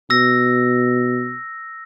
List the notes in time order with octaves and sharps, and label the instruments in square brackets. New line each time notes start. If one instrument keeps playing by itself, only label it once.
[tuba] B2 [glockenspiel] E6 A#6